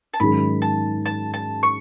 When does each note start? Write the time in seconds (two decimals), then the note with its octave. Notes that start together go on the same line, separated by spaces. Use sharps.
0.14 A5
0.20 G#2 D#3 F#3 C#4 G#4 B5
0.62 A5
1.06 A5
1.34 A5
1.63 C#6